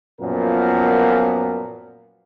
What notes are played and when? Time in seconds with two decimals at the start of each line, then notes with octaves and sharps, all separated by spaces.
0.21 F#2 A#2 F3 B3 A#4